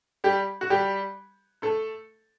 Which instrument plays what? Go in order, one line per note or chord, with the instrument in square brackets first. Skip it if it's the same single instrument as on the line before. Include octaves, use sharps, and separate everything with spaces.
[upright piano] G3 G4
F#4
G3 G4
A3 A4